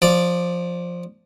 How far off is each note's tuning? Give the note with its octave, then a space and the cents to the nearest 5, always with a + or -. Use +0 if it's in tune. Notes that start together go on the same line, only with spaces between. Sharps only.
F3 +10 D5 +0